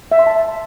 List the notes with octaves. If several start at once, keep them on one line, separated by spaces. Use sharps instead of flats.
E5
C6
A5